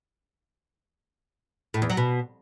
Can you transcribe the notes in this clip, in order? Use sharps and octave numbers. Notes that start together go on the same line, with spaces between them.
A2
E2
F#3
B2